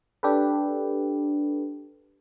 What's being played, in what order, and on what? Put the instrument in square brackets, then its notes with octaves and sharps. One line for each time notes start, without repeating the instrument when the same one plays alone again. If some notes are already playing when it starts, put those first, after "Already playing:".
[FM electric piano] D4 G4 A4 B4